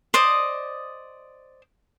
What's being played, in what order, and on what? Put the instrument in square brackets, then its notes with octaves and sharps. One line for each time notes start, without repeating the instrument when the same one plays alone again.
[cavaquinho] C5 D5 D#5 D#6